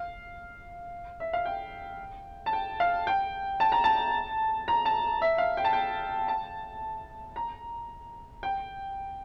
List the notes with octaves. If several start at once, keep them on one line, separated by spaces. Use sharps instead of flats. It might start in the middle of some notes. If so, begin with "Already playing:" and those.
Already playing: F5
E5
F5
G5
A5
G5
F5
G5
A5
A#5
A5
A#5
A5
E5
F5
G5
A5
G5
A5
A#5
G5